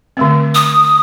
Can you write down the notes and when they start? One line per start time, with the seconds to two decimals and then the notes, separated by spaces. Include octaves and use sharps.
0.17 D3 A3 C4
0.55 D#6